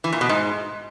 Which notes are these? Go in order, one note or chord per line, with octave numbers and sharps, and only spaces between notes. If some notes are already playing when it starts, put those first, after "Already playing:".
E3
A#2
B2
G#2